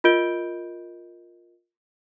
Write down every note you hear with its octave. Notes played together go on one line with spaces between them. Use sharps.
F4 A#4 D#5 G6 D7 G7